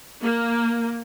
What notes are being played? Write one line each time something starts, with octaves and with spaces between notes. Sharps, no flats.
A#3